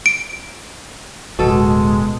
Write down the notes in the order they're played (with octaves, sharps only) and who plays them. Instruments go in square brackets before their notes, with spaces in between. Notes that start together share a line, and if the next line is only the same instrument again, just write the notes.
[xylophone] D7
[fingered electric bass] D1 [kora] B2 A4 [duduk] G#3